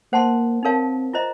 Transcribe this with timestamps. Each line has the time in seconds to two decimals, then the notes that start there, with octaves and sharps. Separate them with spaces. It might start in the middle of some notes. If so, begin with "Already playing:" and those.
0.13 A#3 C5 F#5 A5 C6
0.63 C4 D#4 A#4 C#5 F5 A5
1.13 F4 C5 D#5 A#5